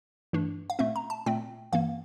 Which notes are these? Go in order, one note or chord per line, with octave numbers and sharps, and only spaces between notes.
G2 E3 A3 D4
F5
A#2 A3 C4 E5
A#5
A5
A#2 A3 C4 G5
G2 E3 A#3 F5